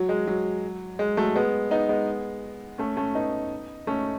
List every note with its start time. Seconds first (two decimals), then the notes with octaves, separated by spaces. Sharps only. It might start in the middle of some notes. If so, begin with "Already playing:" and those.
Already playing: F#3
0.09 G#3
0.27 F#3
0.99 G#3
1.17 F#3 A3
1.35 G#3 B3
1.71 B3 D#4
1.89 G#3 B3
2.78 A3 C#4
2.97 A3 C#4
3.14 B3 D#4
3.87 A3 C#4